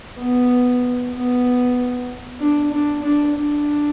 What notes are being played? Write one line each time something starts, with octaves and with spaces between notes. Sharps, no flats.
B3
B3
D4
D4
D4
D4